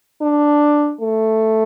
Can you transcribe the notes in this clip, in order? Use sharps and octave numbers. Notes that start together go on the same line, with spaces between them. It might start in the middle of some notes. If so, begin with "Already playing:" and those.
D4
A3